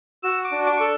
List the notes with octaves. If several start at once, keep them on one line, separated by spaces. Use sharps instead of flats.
F#4 E6
D6
D4
D6
A4 C#6